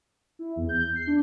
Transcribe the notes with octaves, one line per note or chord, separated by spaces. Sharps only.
E4
E2
G6
C7
D4